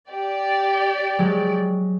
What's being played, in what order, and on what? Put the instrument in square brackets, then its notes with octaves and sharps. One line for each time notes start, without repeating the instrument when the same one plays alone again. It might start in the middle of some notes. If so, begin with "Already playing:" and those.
[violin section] G4 D5
[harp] F#3 G#3